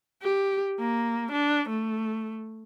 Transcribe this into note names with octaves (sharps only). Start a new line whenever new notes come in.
G4
A#3
D4
A3